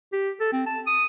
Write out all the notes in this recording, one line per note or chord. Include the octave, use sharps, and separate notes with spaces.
G4
A4
C4
A5
D#6